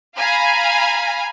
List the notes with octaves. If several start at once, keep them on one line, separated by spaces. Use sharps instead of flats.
F5 G#5 A#5 B5